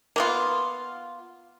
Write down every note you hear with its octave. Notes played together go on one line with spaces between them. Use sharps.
A#3 B3 F4